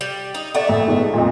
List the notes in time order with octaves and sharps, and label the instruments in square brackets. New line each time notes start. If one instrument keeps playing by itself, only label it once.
[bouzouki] G3
D#4
[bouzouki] A3 [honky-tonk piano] D5 F#5
[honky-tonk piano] A1
G#2 B2
F2 A#2